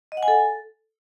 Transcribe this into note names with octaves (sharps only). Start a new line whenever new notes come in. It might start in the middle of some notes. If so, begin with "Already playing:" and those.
D#5
F#5
G#5
A4